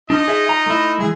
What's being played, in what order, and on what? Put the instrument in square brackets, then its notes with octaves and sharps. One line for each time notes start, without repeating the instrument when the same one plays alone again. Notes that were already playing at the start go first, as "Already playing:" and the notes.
[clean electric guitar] D4 [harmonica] D#4 F4 D#5
[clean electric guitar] G#4 E5
A#5
A3 E4
[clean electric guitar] E3 G#3 [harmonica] G#4